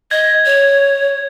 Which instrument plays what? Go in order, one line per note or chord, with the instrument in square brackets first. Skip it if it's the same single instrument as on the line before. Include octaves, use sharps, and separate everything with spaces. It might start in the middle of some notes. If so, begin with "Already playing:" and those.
[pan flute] D#5 [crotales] G#6
[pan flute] C#5